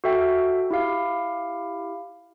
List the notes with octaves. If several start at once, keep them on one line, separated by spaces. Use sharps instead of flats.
F#4 A4 E5 G5
E4 G4 F5